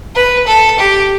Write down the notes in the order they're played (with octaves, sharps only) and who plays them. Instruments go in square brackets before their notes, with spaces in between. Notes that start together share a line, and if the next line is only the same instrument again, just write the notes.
[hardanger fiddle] B4
A4
G4